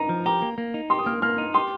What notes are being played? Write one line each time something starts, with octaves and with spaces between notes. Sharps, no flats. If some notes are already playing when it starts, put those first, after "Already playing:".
Already playing: D#4 A#5
F3
G4 A#5
A#3
A#3
D#4
G4 C6
D#6
A#3 F6
A#3 F6
D#4
G4 C6